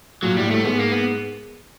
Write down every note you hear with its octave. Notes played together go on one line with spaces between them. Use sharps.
A#2 F#3
A2 G3
A2 A3
G#2 B3
A#3
B3